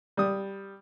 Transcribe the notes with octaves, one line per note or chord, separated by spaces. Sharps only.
G3 D#6